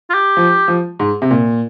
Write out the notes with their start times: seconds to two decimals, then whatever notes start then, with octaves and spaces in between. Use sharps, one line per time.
0.10 F4
0.14 G4
0.37 F3
0.68 F3
0.99 G#2
1.22 C3
1.31 A#2